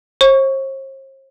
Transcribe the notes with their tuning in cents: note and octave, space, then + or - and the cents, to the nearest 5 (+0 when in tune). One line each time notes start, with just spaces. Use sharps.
C5 +45 C#6 +10